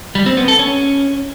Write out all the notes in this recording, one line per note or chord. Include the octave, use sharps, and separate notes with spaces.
G3
C4
B3
A4
C#4